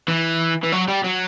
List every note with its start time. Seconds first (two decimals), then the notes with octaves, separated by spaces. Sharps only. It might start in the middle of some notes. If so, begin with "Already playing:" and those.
0.08 E3
0.63 E3
0.72 F#3
0.88 G3
1.04 F#3